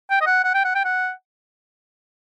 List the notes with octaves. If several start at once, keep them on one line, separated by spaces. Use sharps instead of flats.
G5
D#5
F#5
F#5
G5
F#5
G5
F#5